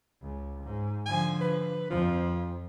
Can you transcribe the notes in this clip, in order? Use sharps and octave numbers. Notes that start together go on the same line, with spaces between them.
C#2
G#2
D3 F3 G#5
B4
F2 F3